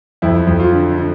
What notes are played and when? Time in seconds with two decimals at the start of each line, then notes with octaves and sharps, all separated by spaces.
0.22 F2 E4
0.47 F2
0.60 F4
0.73 D3
0.98 D3